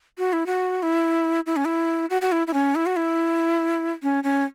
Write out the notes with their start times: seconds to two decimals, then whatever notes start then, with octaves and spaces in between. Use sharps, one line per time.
0.18 F#4
0.33 E4
0.46 F#4
0.83 E4
1.46 E4
1.56 C#4
1.65 E4
2.10 F#4
2.22 F#4
2.32 E4
2.47 E4
2.54 C#4
2.75 E4
2.86 F#4
2.96 E4
4.03 C#4
4.24 C#4